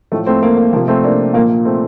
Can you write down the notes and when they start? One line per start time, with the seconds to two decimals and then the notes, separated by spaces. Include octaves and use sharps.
0.12 A2 F3 A3
0.26 A3 C4
0.43 A#3
0.57 A#3
0.73 C3 F3 A#3
0.88 A3 C4
1.04 A#3 D4
1.34 A#2 A#3
1.39 F3
1.50 A#3
1.65 A3 C4